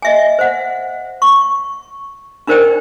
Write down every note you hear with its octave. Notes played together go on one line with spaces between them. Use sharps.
D#5 E5 G#5
C5 F#5
C#6
D4 D#4 A#4 C5 D5 G5